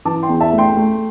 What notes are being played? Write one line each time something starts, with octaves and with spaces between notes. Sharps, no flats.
E3 A5 D6
G5 C6
E2
E5 A5
A3
G5 C6
A3